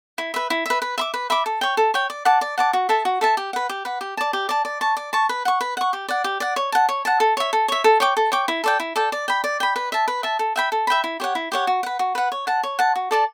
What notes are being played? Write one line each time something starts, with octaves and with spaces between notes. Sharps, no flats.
E4
B4 E5
E4
B4 E5
B4
E5 B5 D6
B4
E5 B5 D6
A4
C#5 G5
A4
C#5 G5
D5
F#5 A5 D6
D5
F#5 A5 D6
F#4
A4 E5 A5
F#4
A4 E5 A5
G4
B4 F#5
G4
B4 F#5
G4
D5 A5
G4
D5 A5
D5
A5 C#6
D5
A5 C#6
B4
F#5 C#6
B4
F#5 C#6
G4
D5 F#5
G4
D5 F#5
C#5
F#5 A5
C#5
F#5 A5
A4
C#5 E5
A4
C#5 E5
A4
C#5 G5 D6
A4
C#5 G5 D6
E4
A4 D5 G5
E4
A4 D5 G5
D5
G5 B5
D5
G5 B5
B4
E5 A5
B4
E5 A5
A4
E5 G5 B5
A4
E5 G5 B5
E4
G4 C#5 F#5
E4
G4 C#5 F#5
F#4
B4 F#5
F#4
B4 F#5
C#5
F#5 A5
C#5
F#5 A5
F#4
A4 D5 A5